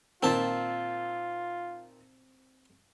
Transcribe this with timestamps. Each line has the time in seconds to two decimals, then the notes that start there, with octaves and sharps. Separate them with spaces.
0.23 A#2 D#3 C4 F4 A5